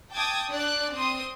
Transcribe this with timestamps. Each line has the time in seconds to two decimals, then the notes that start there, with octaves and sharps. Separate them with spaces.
0.12 G5 A5 D6 D#6 G#6
0.52 D4 D5 F#6
0.94 C4 C6 D#6